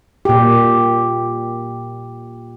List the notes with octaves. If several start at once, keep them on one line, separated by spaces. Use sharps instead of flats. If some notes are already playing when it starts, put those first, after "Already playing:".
A#2 G4